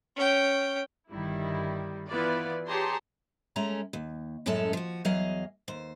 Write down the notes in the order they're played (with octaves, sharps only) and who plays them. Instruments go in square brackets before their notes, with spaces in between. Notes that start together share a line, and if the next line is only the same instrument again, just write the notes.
[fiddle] C#4 G5
[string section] G1 D#3 G3 E4
E3 B3 E4 F4 B4 D5
G4 G#4 C#5 A5 A#5 C6
[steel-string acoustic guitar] G#3 A3 C#4 A#5
D#2
F#2 A2 G#3 C#4 A4 A5
F3 F#4
E2 F#3 G#4 D#5 F5
D#2 C5